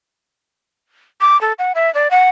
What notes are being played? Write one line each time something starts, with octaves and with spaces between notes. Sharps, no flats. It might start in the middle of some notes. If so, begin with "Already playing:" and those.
D6
A4
F#5
E5
D5
F#5